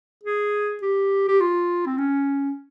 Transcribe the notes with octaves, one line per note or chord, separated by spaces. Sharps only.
G#4
G4
G4
F4
C4
C#4